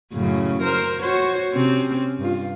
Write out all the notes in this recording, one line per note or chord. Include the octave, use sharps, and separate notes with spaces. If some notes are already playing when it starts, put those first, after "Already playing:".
F#2 A2 C#3
A#4 C5
F#4 C5 C#5
C3 C4 C#4
G2 F4